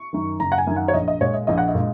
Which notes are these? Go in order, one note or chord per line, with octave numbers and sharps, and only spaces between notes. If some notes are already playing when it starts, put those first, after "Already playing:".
Already playing: C#6
F#2 D#3
F#1 A#5
F#5
G#5
F#2 D#3
F#5
C#5
A#1 D#5
D#5
A#2 G#3 C#5
D#5
A#1 D#5
F#5
D#5
A#2 G#3